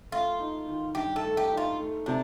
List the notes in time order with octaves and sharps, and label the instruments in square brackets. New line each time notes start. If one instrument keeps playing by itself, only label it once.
[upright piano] A3 [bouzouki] F4
[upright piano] D#4
D#3
[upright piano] G2 [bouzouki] G4
[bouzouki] A4
[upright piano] A3
[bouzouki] G4
[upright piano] D#4
[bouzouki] F4
[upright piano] A3
[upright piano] C3 [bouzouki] D4